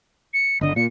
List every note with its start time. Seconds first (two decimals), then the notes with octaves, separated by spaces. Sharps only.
0.34 C#7
0.61 G1 D3 D#5
0.76 A#2 C#7